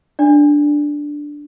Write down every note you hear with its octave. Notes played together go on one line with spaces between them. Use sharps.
D4 D5